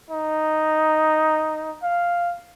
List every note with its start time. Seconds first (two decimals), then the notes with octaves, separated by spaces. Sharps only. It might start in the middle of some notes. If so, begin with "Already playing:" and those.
0.11 D#4
1.83 F5